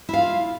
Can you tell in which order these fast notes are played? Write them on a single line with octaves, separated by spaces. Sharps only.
E4 F5 F4